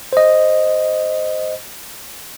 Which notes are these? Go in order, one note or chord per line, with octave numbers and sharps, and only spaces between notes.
C5 D#5